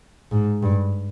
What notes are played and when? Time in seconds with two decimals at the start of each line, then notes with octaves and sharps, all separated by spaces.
0.31 G#2
0.62 G2